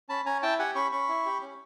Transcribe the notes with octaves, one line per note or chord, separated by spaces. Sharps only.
C#4 A5 B5
C#4 G#5 A#5
E4 G5 A5
G4 F#5 G#5
C#4 B5 C#6
C#4 B5 C#6
E4
G4
C#4